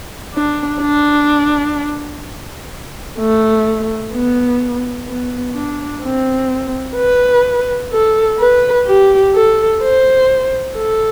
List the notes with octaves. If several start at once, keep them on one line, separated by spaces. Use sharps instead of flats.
D4
D4
A3
B3
B3
D4
C4
B4
A4
B4
G4
A4
C5
A4